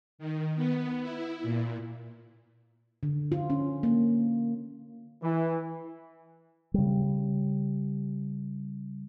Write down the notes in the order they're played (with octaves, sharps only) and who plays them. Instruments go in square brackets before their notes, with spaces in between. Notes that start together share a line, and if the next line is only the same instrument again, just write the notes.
[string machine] D#3
B3
E4
A#2
[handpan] D3
F4
C#4
A#3
[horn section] E3
[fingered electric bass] C#3 G3